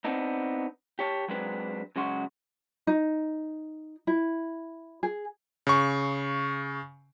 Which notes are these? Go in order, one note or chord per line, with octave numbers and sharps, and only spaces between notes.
B3 C4 D4 D#4
G4 C#5 A5
F#3 G#3 C4 D4 B4
C#3 F#3 G#3 F#4 C6
D#4
E4
G#4
C#3 C#6